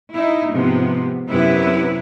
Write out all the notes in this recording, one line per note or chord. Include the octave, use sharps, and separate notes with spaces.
D#4 E4
G#2 C3 F3 B3
F#2 C3 B3 E4 B4